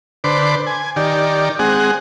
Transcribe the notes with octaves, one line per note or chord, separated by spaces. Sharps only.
D3 B4 C5 D6
G#5
D#3 G4 D5
G#3 C4 G#4 F#5